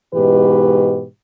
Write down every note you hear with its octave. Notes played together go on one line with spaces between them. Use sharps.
G#2 B2 E3 G4 B4